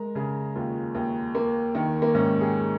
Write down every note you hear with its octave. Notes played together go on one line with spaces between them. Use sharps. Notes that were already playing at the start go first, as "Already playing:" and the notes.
Already playing: G#3 A#4
C#3 G#4
D#2 F4
D#2
A#3
D#3
A#3
G#2 C#4
G#4